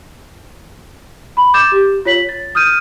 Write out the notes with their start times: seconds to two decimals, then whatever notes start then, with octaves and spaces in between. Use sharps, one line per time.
1.37 B5
1.54 D6 G6 A6 E7
1.72 G4
2.05 F4 C#5 B6 F#7
2.29 A6
2.55 D#6 F6 G6 D#7